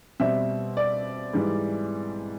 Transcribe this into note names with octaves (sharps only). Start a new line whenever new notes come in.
B2 G3 C4 E5
D5
G#2 E3 G3